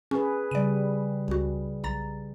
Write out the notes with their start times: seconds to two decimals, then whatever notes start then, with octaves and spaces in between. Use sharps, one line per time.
0.11 C#4 G#4 B4
0.51 C#3 G3 D5 D#7
1.28 C#2 F#4
1.84 B1 A#5 A6